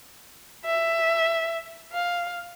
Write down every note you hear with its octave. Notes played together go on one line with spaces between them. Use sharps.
E5
F5